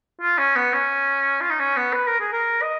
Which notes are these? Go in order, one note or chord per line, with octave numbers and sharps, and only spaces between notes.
F4
C#4
B3
C#4
F4
D#4
C#4
B3
B4
A#4
G#4
A#4
D#5